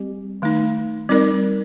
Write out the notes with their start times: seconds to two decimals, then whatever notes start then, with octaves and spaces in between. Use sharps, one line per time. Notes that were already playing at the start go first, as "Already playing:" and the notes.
Already playing: G3 C4 G4
0.42 D#3 A3 D#4
1.09 G3 C4 D#4 A#4 D5